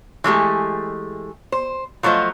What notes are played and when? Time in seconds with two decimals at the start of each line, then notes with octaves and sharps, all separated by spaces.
0.24 E3 G#3 A3 G4
1.52 C5
2.03 F3 F#3 A3 F4 C5 D#5